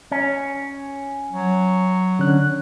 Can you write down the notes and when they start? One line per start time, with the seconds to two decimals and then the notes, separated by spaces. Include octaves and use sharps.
0.11 C#4
1.33 F#3
2.19 D3 C#4 F#6